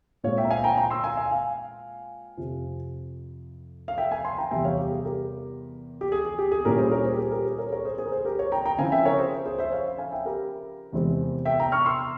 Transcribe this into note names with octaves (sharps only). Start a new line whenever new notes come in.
A#2 G#3 C4 C#5 F5
E5 G5
A#5
F5 G#5
G5 A#5
G5 A#5
C6 E6
F5 G#5
F5 G#5
F5 G#5
F2 C3 F3
F5
E5 G5
F5 G#5
G#5 C6
G5 A#5
E2 C3 G3 E5 G5
C#5 F5
G4
G#4
G4 A#4
G4
G#4
G#4
G4
G#4
A#2 G3 C#4 E4 G4 A#4
G#4 C5
A#4 C#5
G#4 C5
G4
G#4
G4 A#4
G#4 C5
A#4 C#5
A#4 C#5
G#4 C5
G#4 C5
A#4
G#4 C5
G4 A#4
A#4 C#5
G5 A#5
G5 A#5
C#3 F3 C4 E4 F5 G#5
E5 G5
A#4 C#5
G#4 C5
G#4 C5
C5 E5
C#5 F5
F5 G#5
E5 G5
G4 A#4
E2 C3 E3 G#3 C4
E5 G5
G5 A#5
C#6 F6
C6 E6